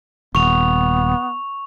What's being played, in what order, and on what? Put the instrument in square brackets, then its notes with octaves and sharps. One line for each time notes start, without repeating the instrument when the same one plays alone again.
[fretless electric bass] D#1 [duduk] B3 [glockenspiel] C#6 F7